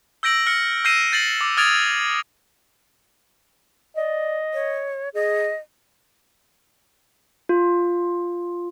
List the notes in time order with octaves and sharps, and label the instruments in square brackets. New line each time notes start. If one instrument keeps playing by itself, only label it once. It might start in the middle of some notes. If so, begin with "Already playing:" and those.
[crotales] E6 G6 A#6 D7 F#7
F6 A#6 C#7
E6 G6 A#6 C7 D#7 E7
G6 A6 C7 F#7
D6
D#6 F6 G#6 A6 D7 F7
[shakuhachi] D5 [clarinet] D#5
[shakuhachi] C#5
[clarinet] G#4 [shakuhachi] D#5
[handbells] F4